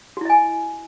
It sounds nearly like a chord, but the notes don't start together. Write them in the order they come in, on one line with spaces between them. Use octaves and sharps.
F#4 E4 D#5 G#5